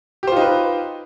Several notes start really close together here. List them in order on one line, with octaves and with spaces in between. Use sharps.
G4 C5 F4 D#4 B4